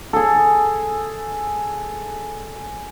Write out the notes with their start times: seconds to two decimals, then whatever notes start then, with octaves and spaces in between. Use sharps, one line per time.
0.13 G#4 A4